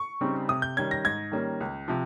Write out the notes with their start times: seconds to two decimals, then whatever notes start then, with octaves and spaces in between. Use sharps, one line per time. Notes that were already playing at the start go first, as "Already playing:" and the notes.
Already playing: C#6
0.21 C#3 G3 C4 D#4
0.49 C3 D#6
0.62 G6
0.77 D#3 G3 C#4 G#6
0.91 A#6
1.04 G#2 G#6
1.32 D#3 G3 A#3 C#4
1.60 C#2
1.88 C3 F3